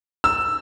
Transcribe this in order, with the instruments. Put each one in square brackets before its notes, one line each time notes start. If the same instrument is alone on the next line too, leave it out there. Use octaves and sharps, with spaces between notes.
[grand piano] E6